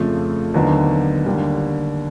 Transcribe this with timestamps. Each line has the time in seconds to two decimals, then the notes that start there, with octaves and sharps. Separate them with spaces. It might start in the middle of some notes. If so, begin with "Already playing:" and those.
Already playing: F2 C#3 F3 A3
0.54 D#2 D3 F#3 B3 D#4
1.26 D#2 D3 G3